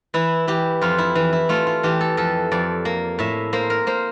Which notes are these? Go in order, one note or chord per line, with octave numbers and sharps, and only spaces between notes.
E3 E4
E3 G4
F2 F4
E4
E3
E4
A3 F4
F4
E3 G4
A4
F2 A4
F2 D5
A#3
A2 E5
A#3 C5
A#4
A#3 C5